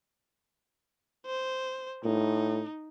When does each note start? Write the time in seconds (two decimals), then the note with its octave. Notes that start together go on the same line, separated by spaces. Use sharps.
1.26 C5
2.04 A2 D#4